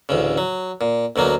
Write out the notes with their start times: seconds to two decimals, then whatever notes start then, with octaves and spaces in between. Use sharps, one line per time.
0.09 A1 D2 C#3
0.38 F#3
0.81 A#2
1.16 D2 B2 F#3 A#3